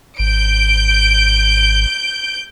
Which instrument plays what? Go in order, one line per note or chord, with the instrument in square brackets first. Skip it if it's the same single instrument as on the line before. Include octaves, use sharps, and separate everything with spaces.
[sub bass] G#1 [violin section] G6 D7